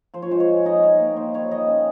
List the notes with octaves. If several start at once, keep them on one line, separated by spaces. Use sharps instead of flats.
F3 C5
C#5
G#3 C5
C#5
G#3
D#4 D#5
G3 C#5
A#3
D#3 C5
G3 C#5
G3 D#5
C#4